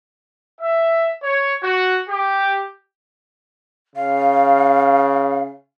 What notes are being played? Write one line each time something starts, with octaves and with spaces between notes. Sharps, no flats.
E5
C#5
F#4
G4
C#3 F5